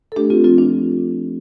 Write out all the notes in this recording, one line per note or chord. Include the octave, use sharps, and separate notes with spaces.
A4
A3 D4 G4
C4 F4
F3 C4 F4
D4